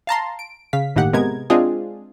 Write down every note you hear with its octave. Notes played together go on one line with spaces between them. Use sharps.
F5 A5 A#5 C6
D7
C#3 F5 B6
G1 A2 D#3 A#3 G4 F#5
C3 G#3 B3 A#4 G#6
G#3 C4 D4 F4 G#4